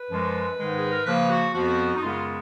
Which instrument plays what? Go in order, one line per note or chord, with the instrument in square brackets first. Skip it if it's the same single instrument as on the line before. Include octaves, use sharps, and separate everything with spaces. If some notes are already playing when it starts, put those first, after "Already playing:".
Already playing: [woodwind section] B4
F#2 F3 G#3
G#2 D#3 G#3
G#4
A#4
C#3 F3 A#3 B4
F#4
F2 F3 B3 F#4
D#4
F#2 C#3 G#3 B3 F4